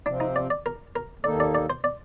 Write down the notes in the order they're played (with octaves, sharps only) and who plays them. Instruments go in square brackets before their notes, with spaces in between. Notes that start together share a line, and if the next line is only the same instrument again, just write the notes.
[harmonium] C3 F3 C4 [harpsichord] D4
[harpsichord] D#4
D5
D5
A#4
A#4
[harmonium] D#2 D#3 A#3 D#4 A4 [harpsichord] D5
[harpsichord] D5
D5
C5
D5